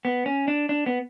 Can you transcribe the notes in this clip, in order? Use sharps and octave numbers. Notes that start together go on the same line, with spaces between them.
B3
C#4
D4
D4
B3